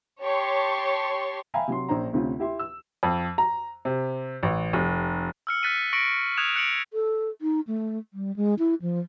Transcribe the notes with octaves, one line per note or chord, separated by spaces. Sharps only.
G4 C#5 A5 C6 C#6
E5 F5 G5 G#5 A#5 B5
C3 F#3 C6
A#1 C#4 D4 C5 A#5
D2 C3 C4 C#4 F4
E4 G4 E5 C6
E6
F2
A#5
C3
A1
F1
E6 F6 C#7
F#6 A6 B6 C#7 D#7
C#6 A#6 C#7 D7 F#7
D#6 F#6 G#6 E7 F7
F#6 C#7 D7 F#7
A4
D#4
A3
G3
G#3
E4
F3